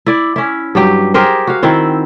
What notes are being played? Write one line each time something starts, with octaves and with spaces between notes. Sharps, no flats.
E4 D5
C#4 E4
G2 F#3 G4
G4 G#4 A#4 C5
F#4 F5
D#3 C4 E4 C5